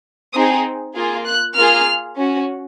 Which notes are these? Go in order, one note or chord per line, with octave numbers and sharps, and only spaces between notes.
C4 D#4 G#4 D#6
A#3 F4 G#4
F#6
A#3 F4 G#4 F6
C#4 F#4